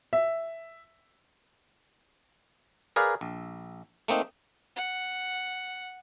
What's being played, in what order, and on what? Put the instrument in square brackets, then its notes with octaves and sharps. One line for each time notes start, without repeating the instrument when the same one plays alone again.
[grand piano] E5
[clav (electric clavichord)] G#4 A#4 B4 D5 F5
A#1
A3 A#3 C4 D#4
[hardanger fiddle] F#5